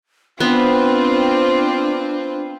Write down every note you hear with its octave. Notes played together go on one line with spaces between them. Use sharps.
B3 C4 D4 F4 B4